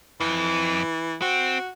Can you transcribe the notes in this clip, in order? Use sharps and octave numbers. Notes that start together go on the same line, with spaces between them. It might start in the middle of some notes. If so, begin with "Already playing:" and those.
F2 E3
C4 F#4